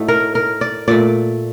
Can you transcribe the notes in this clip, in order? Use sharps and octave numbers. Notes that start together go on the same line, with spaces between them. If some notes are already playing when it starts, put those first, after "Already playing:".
Already playing: A2 A3 D#4 F#4
A#4
A#4
D5
A#2 A3 D5